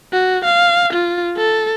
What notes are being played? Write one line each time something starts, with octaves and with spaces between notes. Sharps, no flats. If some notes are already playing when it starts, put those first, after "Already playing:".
F#4
F5
F4
A4